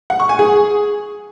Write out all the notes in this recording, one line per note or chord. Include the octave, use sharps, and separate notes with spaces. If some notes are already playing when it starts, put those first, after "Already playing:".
F#5
C#6
G#5
G#4